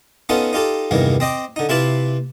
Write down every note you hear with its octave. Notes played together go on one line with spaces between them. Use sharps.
B3 C#4 D#4 F4 A4 F#5
D#4 F4 G4 A4
E2 G2 C3 D#3 A#3
C4 D#5 G5 D6
D3 D#4
C3 E4 F4 B4 A5 D6